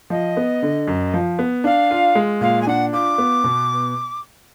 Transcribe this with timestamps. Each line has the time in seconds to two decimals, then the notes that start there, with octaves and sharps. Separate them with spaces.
0.10 F3 D#5
0.37 B3
0.62 D3
0.87 F#2
1.14 F3
1.39 B3
1.64 D4 F5
1.91 F4
2.15 G#3
2.41 A#2 F5
2.61 G#5
2.67 D4 F#5
2.93 F4 D6
3.18 B3
3.44 B2